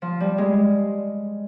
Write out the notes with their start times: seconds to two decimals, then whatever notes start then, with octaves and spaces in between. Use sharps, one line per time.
0.02 F3
0.20 G3
0.38 G#3